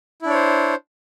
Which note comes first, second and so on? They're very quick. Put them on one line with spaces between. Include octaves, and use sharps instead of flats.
E4 D4 C#5 C5